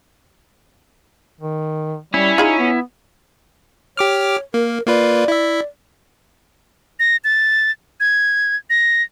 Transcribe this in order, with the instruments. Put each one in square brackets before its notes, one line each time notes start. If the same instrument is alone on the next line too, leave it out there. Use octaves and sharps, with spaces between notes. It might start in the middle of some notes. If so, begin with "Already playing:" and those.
[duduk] D#3
[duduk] G3 [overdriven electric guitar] C#4 [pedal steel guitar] E4
[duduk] D#4 [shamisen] F4 G#4 B5
[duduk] B3
[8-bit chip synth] G4 D6 F6 [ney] C#5
[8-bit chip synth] A#3 [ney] A#4
[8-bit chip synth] A#3 F4 B4 [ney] D5
[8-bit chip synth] E4 E5
[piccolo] A#6
A6
G#6
A#6